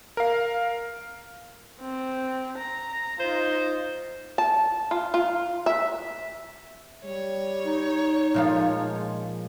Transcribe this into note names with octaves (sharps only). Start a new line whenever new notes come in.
A#4 F5
C4
A#5
D#4 F4 C5
A5
F4
F4
E5
G3 C#5
D#4
A#2 F3 G#3 F5